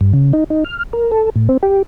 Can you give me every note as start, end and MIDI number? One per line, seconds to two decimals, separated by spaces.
0.01 0.13 43
0.14 0.32 49
0.33 0.44 63
0.50 0.64 63
0.64 0.83 89
0.93 1.11 70
1.12 1.30 69
1.36 1.48 45
1.49 1.57 60
1.63 1.82 67